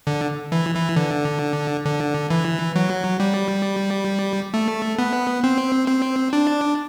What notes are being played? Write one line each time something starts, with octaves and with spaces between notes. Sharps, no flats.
D3
E3
E3
D3
D3
E3
F#3
G3
A3
B3
C4
C4
D4